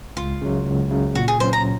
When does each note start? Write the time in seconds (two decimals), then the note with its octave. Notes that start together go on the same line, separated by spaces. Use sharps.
0.16 C#2 F4
0.42 C#3 F#3
0.66 C#2
0.91 C#3 F#3
1.15 A#2 F#4
1.28 G#4
1.40 F#3 C#4 C5
1.53 A#5